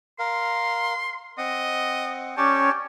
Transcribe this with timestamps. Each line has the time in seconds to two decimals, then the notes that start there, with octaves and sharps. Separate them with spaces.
0.19 A#4 F5 C6
1.38 C4 D#5 F#5
2.37 C#4 G4 C#5 D5 G5 A5